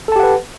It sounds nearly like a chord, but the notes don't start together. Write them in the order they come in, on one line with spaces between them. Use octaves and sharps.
A4 A5 G4 F#5 B4